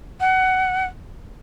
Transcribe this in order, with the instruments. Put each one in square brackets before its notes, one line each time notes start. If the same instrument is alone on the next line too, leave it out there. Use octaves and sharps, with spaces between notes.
[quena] F#5